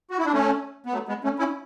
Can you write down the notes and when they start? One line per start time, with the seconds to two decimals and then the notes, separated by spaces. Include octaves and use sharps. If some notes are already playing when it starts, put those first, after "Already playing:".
0.10 F#4
0.18 E4
0.25 D4
0.33 A3 C#4
0.86 B3
0.93 F#3 A3
1.08 G#3 B3
1.24 A3 C#4
1.39 C#4 E4